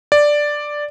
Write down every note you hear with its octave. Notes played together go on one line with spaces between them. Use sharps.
D5